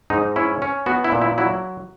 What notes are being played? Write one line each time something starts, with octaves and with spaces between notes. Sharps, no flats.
G#2 D#4
C#4 E4
C#4
B3 F#4
E4
A#2
E4
F#3 E4